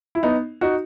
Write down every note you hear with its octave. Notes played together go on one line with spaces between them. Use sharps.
E4
B3 D#4
D#4 F#4